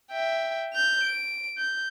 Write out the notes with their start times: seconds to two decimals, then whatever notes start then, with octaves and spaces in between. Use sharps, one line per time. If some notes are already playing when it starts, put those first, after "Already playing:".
0.11 E5 G5
0.74 G6 F7
1.03 D7
1.58 G6